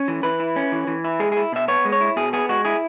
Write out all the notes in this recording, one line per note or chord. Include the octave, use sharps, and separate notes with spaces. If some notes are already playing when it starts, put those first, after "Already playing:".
Already playing: C#4
E3
E3 B4
E4
C#4
E3
E3
E4
G#3 G#4
G#4
E4
B2 E5
B3 C#5
G#3
C#5
E4
B2 G#4
B3 G#4
G#3 F#4
E4 G#4